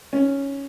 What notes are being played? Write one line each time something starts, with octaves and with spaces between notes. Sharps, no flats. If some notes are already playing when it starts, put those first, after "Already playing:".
C#4